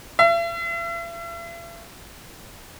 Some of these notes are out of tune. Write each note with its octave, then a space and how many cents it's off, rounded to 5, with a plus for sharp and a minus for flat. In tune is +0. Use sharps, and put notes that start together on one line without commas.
E5 +45